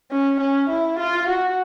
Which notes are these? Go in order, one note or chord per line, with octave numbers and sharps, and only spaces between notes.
C#4
C#4
E4
F4
F#4